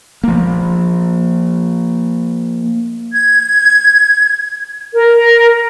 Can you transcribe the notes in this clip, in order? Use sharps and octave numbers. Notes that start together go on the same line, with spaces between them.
F3 A#3
G#6
A#4